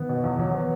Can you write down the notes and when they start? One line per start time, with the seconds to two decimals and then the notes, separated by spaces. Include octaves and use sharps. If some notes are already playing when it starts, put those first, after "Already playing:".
Already playing: D#3 B3
0.09 B2
0.24 E2
0.39 E3 F#3
0.54 B3